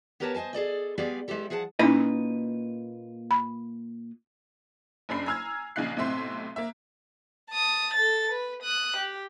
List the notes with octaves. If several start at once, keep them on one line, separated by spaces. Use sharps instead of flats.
B3 G4 A#4 B4 C#5 A5
C5 D#5 F5 G#5 A5
G#4 A4 D5 D#5
G#3 B3 G4 G#4 D5 F5
G#3 B3 E4 G4 A4
F3 G#4 F#5 G#5 A5
A#2 C#4 D#4 E4 B4 D#5
B5
F#1 F#2 D4 B5 C7
G#5 A#5 E6 F6 G#6
A#1 C#3 D#4 F5 F#6 C7
B1 A2 C3 C4 E5 C6
A#3 E5
A5 D#6
A4 A6
B4
D#6 F#6
G4